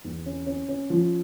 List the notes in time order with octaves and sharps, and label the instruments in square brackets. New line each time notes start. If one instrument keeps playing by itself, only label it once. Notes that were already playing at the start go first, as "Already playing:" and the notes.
[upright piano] E2
C#4
C#4
C#4
F3